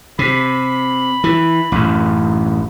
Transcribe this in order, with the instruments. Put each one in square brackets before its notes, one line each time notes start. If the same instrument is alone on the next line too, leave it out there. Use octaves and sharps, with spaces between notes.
[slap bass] C3 [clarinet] B5
[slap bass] E3
A1 F#2